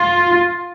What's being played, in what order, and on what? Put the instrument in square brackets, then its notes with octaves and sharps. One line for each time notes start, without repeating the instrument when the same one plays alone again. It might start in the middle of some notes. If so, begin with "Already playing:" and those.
Already playing: [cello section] F4